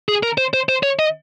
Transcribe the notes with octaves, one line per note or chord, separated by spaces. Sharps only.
G#4
A#4
C5
C5
C5
C#5
D#5